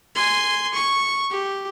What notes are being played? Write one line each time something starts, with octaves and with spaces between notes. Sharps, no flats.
G#5 C6
C#6
G4